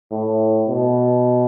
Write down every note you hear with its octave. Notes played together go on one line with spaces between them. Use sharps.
A2
B2